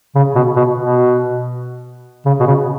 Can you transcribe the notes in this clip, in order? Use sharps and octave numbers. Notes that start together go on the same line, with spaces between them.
C#3
B2
B2
B2
C#3
B2
C#3